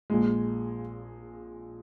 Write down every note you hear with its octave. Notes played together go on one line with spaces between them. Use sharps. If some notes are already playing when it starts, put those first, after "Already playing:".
A#1 A#2 G#3